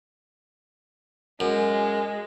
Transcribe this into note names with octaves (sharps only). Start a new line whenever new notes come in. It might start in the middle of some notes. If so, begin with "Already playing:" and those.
F#2 G#3